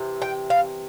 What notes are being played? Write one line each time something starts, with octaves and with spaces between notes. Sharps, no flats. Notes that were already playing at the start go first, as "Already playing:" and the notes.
Already playing: C3 E3
G5
F5